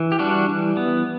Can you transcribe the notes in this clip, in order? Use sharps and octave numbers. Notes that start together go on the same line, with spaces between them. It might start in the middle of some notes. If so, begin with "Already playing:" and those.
Already playing: E3
G4
G3 D4 F#4
E3
B3